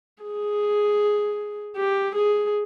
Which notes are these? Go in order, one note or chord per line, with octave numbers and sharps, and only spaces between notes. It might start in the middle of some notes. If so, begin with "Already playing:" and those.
G#4
G4
G#4